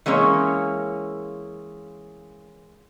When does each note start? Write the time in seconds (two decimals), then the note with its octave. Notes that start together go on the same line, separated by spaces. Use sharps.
0.06 E3 G#3 A#3 C#4 C#5